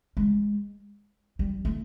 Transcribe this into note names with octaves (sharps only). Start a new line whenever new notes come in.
G#3
G3
A3